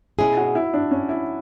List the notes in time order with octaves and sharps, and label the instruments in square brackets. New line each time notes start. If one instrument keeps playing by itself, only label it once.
[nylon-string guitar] B2 G#3 C#4 G#4 [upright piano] E4
[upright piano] F#4
E4
D4
C#4
E4